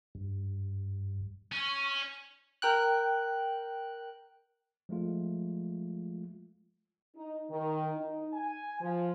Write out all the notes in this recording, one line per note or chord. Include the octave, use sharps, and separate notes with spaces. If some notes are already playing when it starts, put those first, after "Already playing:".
G2
C#4 C#6
A#4 G5 F#6
F3 G#3 A3 F4
D#4
D#3
D#4
G#5
F3